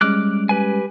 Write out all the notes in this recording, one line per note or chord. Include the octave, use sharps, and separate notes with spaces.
G3 G#3 C#4 D6 F6 F#6
G4 B4 G#5